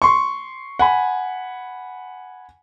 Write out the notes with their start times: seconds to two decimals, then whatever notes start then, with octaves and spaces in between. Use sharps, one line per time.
0.02 C6 C#6
0.79 F#5 G#5 B5